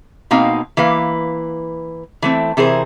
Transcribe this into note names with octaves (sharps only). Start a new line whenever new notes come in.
B2 A#3 C4 D#4 F5
E3 A#3 B4 F5
E3 A3 C4
C3 E3 G#4 A#4 C5